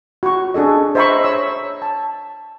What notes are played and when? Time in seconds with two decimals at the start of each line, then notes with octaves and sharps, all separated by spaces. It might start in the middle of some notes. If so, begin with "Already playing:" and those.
0.23 F#4 C#6
0.54 D4 G#4 A4 D#5
0.95 C5 D#5 E5 A#5 B5 C#6
1.24 C#5 E6
1.82 A5